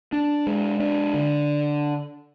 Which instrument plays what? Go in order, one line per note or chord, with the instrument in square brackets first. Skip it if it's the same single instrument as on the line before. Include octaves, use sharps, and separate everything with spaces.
[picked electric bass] D4
G#3
D4
D3